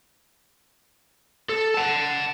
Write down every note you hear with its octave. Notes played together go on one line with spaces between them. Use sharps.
A4
F#5 A5